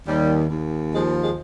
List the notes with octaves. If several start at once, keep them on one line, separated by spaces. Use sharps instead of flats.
D#2 G3
D#2
F3 G#3
G#3